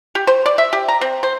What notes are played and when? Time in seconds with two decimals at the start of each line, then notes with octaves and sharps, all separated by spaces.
0.15 G4
0.27 C5
0.46 D5
0.58 E5
0.73 G4
0.88 A#5
1.01 C4
1.23 C5